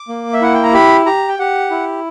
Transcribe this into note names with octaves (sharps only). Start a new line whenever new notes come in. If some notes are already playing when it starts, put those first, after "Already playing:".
Already playing: D6
A#3
E5
E4 F#5
G5
A#5
G4 B5
G4 A#5
G5
G4 F#5
E4